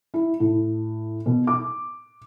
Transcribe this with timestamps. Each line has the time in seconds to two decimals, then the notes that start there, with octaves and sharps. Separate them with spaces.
0.14 E4
0.40 A2
1.26 B2
1.47 D6